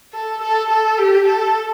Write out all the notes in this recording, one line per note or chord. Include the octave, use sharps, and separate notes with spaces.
A4
A4
A4
G4
A4